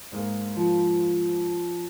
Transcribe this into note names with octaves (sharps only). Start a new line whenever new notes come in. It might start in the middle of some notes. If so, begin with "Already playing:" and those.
G#2 G#3 A#3
F3